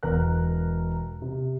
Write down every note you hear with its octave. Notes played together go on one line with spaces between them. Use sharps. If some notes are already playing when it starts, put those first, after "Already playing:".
E1 A#4 F#6
C3